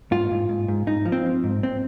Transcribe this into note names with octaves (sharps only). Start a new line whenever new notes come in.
G#2 F4
G#2
G#2
G#2
G#2 D#4
F3
C4
F3
G#2
C4